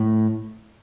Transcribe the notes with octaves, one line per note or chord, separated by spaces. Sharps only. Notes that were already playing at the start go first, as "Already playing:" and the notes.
Already playing: A2